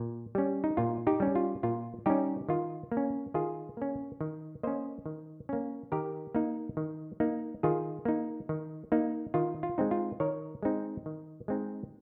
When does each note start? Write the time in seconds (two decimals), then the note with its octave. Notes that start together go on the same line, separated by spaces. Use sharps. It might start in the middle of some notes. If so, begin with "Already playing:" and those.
Already playing: A#2
0.35 G3 C#4
0.64 D#4
0.77 A#2 F4
1.07 D#4 G4
1.20 G3 C#4
1.36 F4
1.63 A#2 F4
2.06 G3 C#4 D#4 G4
2.49 D#3 F4
2.92 A#3
2.97 C#4
3.34 D#3 F4 G#4
3.77 A#3 C#4
4.21 D#3
4.63 A#3 C#4 C5 D#5
5.06 D#3
5.49 A#3 C#4
5.92 D#3 G4 A#4
6.35 A#3 D#4
6.77 D#3
7.20 A#3 D#4
7.63 D#3 F4 G#4
8.05 A#3 D#4
8.49 D#3
8.92 A#3 D#4
9.34 D#3 F4
9.63 F4
9.78 G#3 C4 D#4
9.91 F4
10.20 D#3 A#4 C#5
10.63 G#3 C4 D#4
11.06 D#3
11.48 G#3 C4 D#4